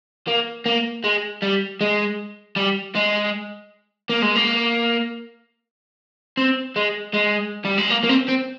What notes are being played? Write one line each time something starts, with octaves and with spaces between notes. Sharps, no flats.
A#3
A#3
G#3
G3
G#3
G3
G#3
A#3
G#3
A#3
C4
G#3
G#3
G3
G#3
A#3
A#3
C4
C4